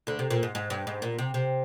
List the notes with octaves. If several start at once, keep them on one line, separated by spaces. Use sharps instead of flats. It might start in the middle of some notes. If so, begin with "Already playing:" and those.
D2 D3
C3
A#2
G#2
G#2
G2
G#2
A#2
C3
C3